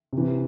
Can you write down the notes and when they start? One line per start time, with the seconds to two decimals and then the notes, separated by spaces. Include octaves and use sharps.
0.13 C3
0.18 E3